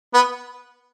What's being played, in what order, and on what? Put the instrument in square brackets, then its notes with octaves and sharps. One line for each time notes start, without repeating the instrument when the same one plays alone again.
[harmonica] B3